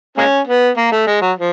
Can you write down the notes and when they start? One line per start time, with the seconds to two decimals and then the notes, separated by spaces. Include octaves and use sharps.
0.18 G#3 A#3 C#4
0.47 B3
0.77 A#3
0.92 A3
1.07 G#3
1.22 F#3
1.37 F3